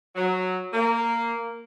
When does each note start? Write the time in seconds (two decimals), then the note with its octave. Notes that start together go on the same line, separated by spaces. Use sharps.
0.16 F#3
0.73 A#3